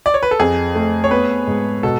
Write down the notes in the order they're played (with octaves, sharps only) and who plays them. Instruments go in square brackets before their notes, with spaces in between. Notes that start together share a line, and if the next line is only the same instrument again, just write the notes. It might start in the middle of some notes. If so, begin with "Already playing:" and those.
[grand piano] D5
C#5
B4
A4
[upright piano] F2 [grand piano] G#4
[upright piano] A3
[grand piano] C#5
[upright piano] B3 [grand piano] B4
[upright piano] G#2
[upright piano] B2 [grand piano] A4